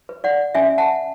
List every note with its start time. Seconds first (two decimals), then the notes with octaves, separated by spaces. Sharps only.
0.09 B4
0.24 D5 F#5
0.55 C#4 E5 G#5
0.78 F#5 A5